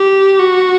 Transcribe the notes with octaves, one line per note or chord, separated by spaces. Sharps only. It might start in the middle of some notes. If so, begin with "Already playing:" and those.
Already playing: G4
F#4